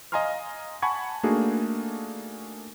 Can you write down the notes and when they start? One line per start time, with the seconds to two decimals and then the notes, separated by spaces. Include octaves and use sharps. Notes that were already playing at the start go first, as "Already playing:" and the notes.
0.12 D#5 F5 G#5 A#5 C6 F6
0.82 F#5 G#5 A5 B5 C#6 G#6
1.23 A3 A#3 D4 D#4 F#4 G#4